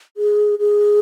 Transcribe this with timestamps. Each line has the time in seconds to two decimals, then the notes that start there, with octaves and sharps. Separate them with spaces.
0.17 G#4
0.59 G#4